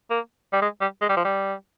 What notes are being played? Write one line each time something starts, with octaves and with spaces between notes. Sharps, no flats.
A#3
G3
G#3
G3
G#3
G3
F3
G3